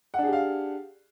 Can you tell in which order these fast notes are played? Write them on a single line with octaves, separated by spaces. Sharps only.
F#5 D4 G#4 G4 F5